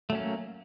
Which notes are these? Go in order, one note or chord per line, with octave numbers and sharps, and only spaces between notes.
F#3 A3 A#3 C#4